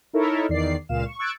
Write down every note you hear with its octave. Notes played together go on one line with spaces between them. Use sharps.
D#4 E4 A4 A#4 C#5 E5
E2 D#3 D5 C7
C#2 A#2 F5 E7
C#6
C#6 E6 F#6 G#6 A6 D7